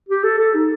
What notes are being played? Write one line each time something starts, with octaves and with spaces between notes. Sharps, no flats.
G4
A4
A4
D#4